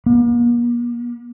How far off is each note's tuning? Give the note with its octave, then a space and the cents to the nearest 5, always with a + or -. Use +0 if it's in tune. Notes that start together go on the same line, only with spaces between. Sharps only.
A#3 +45